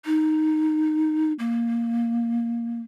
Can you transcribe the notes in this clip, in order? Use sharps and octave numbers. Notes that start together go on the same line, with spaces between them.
D#4
A#3